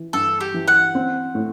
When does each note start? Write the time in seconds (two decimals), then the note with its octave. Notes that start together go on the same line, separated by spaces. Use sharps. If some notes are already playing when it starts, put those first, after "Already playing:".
Already playing: E3
0.13 G2 A4
0.40 G4
0.54 E3
0.68 F#5
0.95 C4
1.35 A2